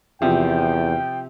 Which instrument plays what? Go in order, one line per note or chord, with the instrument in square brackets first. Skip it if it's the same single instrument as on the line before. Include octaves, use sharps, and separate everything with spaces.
[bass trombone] E2 [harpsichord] C3 [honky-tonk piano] F3 [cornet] G5